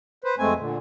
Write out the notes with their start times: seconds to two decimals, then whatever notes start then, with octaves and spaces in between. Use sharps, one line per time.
0.24 B4 C5
0.39 F2 G#3 A3 C4 G#5
0.58 A#2 D3